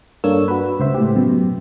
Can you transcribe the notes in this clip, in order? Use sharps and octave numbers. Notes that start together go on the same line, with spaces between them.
G2 A#3 D4 A4 C#5 E6
F#4 B4
C#2 C5 E5
A2 G4
F#2 B2